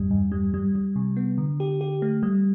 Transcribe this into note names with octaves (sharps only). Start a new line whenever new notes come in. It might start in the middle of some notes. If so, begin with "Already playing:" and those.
Already playing: E2 G2 G3
G2
G3
G3
G3
C3
B3
D3
G4
G4
A3
G3